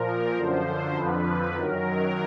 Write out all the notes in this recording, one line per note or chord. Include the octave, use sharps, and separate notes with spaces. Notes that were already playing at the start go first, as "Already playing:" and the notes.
Already playing: A#2 F3 A#4
F#2 D3 F3 C5
F2 D3 F3 B4
F#2 D#3 F#3 A#4